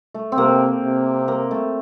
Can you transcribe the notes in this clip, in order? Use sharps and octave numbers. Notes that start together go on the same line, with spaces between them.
A3
C4
C3 A#3
C3
A#3
A3